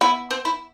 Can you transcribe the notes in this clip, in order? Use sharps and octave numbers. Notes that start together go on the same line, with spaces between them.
B3 E4
C4
E4